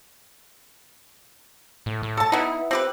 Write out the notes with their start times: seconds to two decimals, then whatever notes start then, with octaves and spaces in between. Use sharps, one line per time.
1.86 A2
2.03 A2
2.17 A4 A5
2.32 B3 D#4 E4
2.71 C4 G4 B4